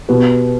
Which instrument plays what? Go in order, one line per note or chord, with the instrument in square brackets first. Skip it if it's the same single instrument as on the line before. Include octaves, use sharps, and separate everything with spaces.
[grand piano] B2 [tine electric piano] G4 B4